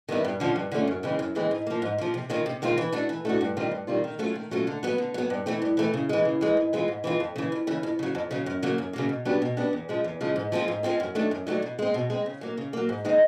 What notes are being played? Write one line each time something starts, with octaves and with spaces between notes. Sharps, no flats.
D#3 G3 B3 E4
G2
D3 F3 A3 C#4
G2
D3 F3 A3 C#4
F#2
C#3 E3 G#3 C4
F#2
C#3 E3 G#3 C4
G#2
F3 A#3
G#2
F3 A#3
C3
D#3 G#3 C4 F4
C3
D#3 G#3 C4 F4
E3
A3 D4 F#4
E3
A3 D4 F#4
G2
D#3 G3 C4 F4
G2
D#3 G3 C4 F4
D#3
F#3 A3 C#4 F4
D#3
F#3 A3 C#4 F4
D3
F#3 B3
D3
F#3 B3
G2
E3 A3 C4
G2
E3 A3 C4
C#3
E3 G#3
C#3
E3 G#3
G#2
E3 G#3 C4 F4
G#2
E3 G#3 C4 F4
F2
C#3 E3
F2
C#3 E3
F2
C#3 F#3
F2
C#3 F#3
F#2
C#3 F#3 A#3
F#2
C#3 F#3 A#3
B2
F#3 B3 D4 G4
B2
F#3 B3 D4 G4
E2
C#3 F3 G#3
E2
C#3 F3 G#3
G#2
F3 G#3 C4 F4
G#2
F3 G#3 C4 F4
F#2
D#3 F#3 A3 D4
F#2
D#3 F#3 A3 D4
B2
G#3 C4
B2
G#3 C4
C#3
F#3 A#3
C#3
F#3 A#3
G#2
D#3 G#3 C4 D#4